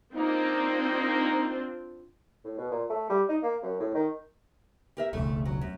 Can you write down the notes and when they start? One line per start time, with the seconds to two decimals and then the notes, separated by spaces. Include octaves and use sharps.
0.14 A#3 C4 D4 D#4 F4
2.45 A2
2.58 B2
2.71 A#2
2.90 A3
3.09 G3
3.29 D#4
3.43 A#3
3.63 F#2
3.80 A2
3.94 D#3
4.97 G4 A#4 E5
5.13 E1 C#2 A3
5.45 F#3
5.61 F#2